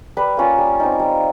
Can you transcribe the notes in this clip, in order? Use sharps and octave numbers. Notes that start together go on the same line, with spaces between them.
G3 B4
A#3 C#4 F4
G3
C4 D#4
G3